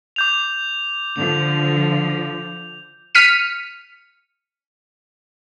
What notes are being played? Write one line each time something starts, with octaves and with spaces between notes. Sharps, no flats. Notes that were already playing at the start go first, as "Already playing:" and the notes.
D6 G6 F7
D3 F3 F7
F6 B6 C#7 D#7